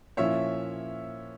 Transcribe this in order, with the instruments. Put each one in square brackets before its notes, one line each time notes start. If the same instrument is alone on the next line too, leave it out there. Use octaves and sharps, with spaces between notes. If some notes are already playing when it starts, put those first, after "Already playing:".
[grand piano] A#2 F3 C#4 E4 [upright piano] C#5 E5